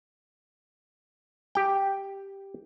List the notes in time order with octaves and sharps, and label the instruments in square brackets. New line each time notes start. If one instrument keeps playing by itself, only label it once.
[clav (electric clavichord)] G4 G5